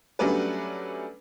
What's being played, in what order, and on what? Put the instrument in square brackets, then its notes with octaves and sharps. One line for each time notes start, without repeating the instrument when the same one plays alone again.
[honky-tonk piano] F#3 G3 A3 C#4 D4 B4